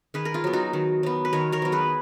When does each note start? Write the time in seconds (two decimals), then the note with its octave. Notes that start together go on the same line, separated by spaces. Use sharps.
0.14 D#3 G#4 B4
0.25 A#4
0.34 F4 G#4
0.44 F#3 B3
0.53 D#4 F#4
0.73 D#3
1.03 F#3 B3
1.25 B4
1.33 D#3 A#4 C#5
1.52 A#4 C#5
1.62 F#3 B3
1.72 G#4 B4